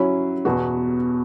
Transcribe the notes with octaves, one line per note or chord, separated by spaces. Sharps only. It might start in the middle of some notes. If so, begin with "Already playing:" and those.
Already playing: F#3 C#4 E4
E2 B2 B3 F#4